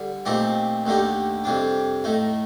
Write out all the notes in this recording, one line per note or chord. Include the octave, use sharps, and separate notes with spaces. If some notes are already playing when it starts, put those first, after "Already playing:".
Already playing: D3 G3
A#2 A3 C4 D#4 G4
D#2 D3 A3 D#4 G4
F2 C3 G3 D4
A2 A3 D#4